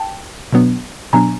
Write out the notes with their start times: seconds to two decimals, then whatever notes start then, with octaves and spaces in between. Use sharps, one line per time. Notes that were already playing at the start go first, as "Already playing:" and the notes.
Already playing: G5 A5
0.53 B2 F#3 B3 D4
1.13 B2 F#3 B3 D4 G#5 A#5